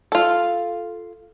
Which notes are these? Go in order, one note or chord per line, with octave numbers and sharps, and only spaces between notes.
F4 A4